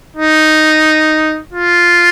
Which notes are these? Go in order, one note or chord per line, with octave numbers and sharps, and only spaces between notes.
D#4
F4